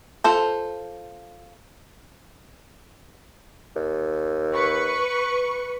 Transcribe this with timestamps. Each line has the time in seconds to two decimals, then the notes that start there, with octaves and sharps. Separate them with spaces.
0.24 F4 A4 C5
3.76 D#2
4.53 B4 C#6